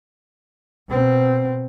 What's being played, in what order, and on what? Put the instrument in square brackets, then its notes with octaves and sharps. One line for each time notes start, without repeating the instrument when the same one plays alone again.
[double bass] B2 C4